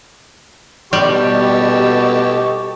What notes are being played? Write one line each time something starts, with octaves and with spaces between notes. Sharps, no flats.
B2 G3 G4 A4 D#5 C#6